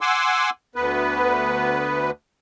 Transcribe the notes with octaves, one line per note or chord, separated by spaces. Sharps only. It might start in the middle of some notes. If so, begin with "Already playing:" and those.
F#5 G#5 C6 D6 E6
D2 B3 B4